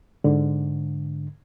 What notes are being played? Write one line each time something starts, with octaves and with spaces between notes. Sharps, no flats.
G#2 D3